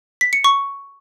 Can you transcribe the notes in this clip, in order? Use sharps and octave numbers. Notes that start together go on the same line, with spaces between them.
B6
C#7
C#6